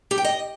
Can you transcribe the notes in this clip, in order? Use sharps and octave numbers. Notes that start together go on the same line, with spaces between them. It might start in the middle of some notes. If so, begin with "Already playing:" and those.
G4
G5
D#5